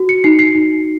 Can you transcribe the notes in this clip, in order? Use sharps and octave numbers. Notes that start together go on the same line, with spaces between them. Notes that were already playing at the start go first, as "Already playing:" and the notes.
Already playing: F#4
C#7
D#4 C7
C7
D#4